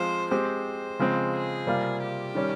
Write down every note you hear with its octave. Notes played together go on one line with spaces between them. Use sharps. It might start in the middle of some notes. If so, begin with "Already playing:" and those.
Already playing: F3 G#3 C4 F4 C5
G#3 C4 G4 C5
C#3 F3 G#3 C4
G#4
C3 G3 A#3 F4
G4
D#3 G3 C#4